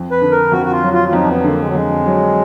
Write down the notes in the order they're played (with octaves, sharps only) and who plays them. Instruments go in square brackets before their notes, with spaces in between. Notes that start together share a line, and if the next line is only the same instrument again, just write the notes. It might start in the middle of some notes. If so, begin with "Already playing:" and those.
Already playing: [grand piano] F2
[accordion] B4
[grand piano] D3
[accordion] A#4
[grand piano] F2 [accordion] F#4
[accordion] F#4
F4
[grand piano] F#3
[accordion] F4
F4
[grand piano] F2 [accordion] D#4
[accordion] D4
B3
[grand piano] D3 [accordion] A#3
[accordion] G#3
F#3
[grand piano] F2 [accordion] G#3
[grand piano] F#3